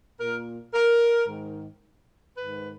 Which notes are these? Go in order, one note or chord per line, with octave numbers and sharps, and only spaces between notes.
A#2 A#4
A#4
G#2 D#3
G#2 D#3 B4